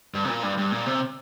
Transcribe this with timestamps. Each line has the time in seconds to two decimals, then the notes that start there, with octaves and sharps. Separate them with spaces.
0.14 G2
0.25 C3
0.29 A#2
0.43 G2
0.58 G2
0.72 A#2
0.86 C3